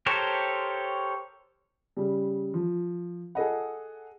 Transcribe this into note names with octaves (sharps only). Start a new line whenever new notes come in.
G4 A4 A#4 C5 C#5
C#3 G3
F3
G#4 A4 D#5 F#5